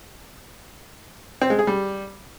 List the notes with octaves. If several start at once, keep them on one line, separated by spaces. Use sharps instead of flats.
C4
G#3
G#4
G3